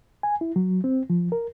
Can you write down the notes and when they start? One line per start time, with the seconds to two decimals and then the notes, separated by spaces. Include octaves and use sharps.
0.23 G#5
0.41 E4
0.56 F#3
0.84 C4
1.10 F3
1.32 A#4